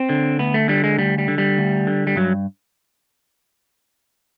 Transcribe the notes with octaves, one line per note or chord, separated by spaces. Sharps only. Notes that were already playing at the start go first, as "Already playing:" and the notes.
Already playing: C4
D3
D2 B3
A3
D3 G3
G#3
D2 G3
G3
D3
G3
D2
D3
G3
G2 F#3